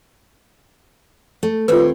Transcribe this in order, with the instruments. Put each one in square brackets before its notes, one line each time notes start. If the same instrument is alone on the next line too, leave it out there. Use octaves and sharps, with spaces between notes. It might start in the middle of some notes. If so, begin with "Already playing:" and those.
[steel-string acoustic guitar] A3
[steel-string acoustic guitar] D#2 C4 C#5 [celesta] F4 B4